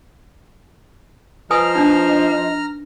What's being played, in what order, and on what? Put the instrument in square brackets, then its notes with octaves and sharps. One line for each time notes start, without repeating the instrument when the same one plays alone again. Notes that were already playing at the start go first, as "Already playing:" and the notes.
[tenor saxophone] F3 [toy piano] B4 G#5 D#6 [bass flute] D#5 [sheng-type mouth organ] A#5 F6
[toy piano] D4 D#4